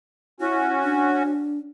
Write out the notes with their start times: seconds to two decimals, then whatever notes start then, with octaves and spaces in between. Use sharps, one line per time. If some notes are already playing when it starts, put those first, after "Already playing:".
0.40 C#4 E4 F#4
0.83 D4